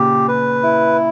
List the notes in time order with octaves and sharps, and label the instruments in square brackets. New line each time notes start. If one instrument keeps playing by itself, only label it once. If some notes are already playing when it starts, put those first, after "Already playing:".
Already playing: [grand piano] A#2 C#3 [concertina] G4
[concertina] B4
E4